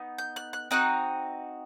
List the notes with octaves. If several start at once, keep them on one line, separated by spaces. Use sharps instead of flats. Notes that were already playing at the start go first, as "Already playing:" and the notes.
Already playing: B3 D#4
G6
F#6
F#6
C4 D#4 F#4 F#6